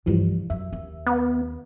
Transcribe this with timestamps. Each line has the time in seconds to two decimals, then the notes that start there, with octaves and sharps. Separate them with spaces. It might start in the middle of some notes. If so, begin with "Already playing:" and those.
0.06 C2 G2 E3 F3 G3
0.50 F#2 E5
0.73 D#2
1.06 B3